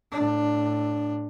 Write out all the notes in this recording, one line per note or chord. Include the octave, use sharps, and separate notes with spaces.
A2 D4